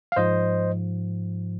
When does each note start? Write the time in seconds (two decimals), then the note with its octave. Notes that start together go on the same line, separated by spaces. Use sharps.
0.12 F5
0.16 G#2 F3 C5 D#5